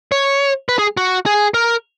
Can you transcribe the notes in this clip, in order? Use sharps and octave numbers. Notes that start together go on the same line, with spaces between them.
C#5
B4
G#4
F#4
G#4
A#4